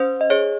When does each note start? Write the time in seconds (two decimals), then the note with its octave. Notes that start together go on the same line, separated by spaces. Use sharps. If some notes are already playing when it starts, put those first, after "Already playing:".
Already playing: C#4 C5
0.21 D#5
0.30 G#4 C#5